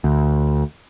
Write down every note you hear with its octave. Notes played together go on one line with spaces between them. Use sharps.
D2